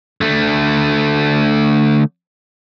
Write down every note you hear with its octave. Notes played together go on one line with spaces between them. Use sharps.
D3 A3